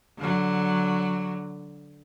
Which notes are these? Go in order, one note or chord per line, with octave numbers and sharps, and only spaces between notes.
D3 F#3